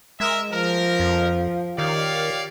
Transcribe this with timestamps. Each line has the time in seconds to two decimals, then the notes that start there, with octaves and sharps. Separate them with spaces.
0.20 G#3 A#4 E5
0.52 F3 A#4
0.99 F2
1.78 D#3 G4 C#5 D5 F5